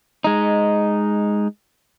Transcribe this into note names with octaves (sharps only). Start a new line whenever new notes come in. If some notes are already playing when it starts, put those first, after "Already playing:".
G#3 D#4